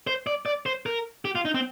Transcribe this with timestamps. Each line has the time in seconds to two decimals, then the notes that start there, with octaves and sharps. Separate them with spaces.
0.07 C5
0.27 D5
0.46 D5
0.66 C5
0.86 A#4
1.25 G4
1.35 F4
1.45 D#4
1.54 C4